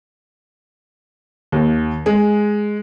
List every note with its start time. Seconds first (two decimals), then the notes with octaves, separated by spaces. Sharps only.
1.52 D#2
2.06 G#3